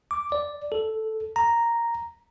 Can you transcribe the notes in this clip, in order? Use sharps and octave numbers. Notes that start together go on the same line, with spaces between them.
D6
D5
A4
A#5